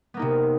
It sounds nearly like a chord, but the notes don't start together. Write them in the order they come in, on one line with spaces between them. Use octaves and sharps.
B3 A#3 D#4 C3